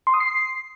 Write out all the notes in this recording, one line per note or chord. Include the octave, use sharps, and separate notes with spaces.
C6
D#6
C7